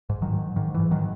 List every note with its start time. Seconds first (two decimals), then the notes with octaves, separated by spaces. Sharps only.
0.10 G#2
0.22 D#3 F#3
0.33 G#2
0.56 G#2 D#3
0.74 G#2 E3
0.91 D#3 F#3